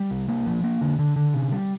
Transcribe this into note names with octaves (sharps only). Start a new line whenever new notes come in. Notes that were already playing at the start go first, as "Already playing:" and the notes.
Already playing: G3
C2
A#3
F3
A#3
D3
D3
D3
C3
G3